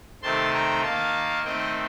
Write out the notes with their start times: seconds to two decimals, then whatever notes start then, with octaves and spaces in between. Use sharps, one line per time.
0.23 C3 D#3 A3 C4 A5 C6
0.53 G5 A#5
0.83 D#3 A#3 F5 A5
1.44 D#3 A3 C4 D#5 G5